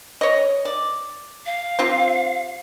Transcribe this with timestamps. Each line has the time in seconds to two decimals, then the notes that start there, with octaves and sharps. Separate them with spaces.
0.21 C#5 D#5
0.65 D5
1.46 F5
1.79 C4 F4 G4